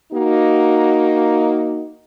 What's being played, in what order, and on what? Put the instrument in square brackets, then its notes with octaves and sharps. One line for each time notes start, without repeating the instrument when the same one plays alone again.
[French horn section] A#3 D#4 F#4